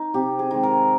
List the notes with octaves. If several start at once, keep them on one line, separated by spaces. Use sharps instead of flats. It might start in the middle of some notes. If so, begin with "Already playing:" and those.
Already playing: D#4
C3 G4
G#4
D#3 G#3
A#4